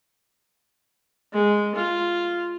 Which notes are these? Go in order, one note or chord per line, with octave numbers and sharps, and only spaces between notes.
G#3
F4